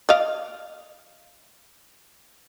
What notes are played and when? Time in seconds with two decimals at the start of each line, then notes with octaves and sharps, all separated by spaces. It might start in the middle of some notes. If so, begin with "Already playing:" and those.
0.09 D5 D#5 F5